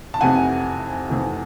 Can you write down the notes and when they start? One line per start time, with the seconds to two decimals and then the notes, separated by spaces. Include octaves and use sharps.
0.14 A5
0.21 F2 C3 E3 A3 F#5 G#5
1.08 F2 C3 E3 A3